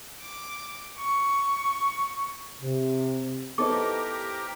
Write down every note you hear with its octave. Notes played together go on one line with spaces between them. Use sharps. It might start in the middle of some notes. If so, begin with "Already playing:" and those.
D6
C#6
C3
B3 D#4 E4 G4 A4 A#4 C5 D6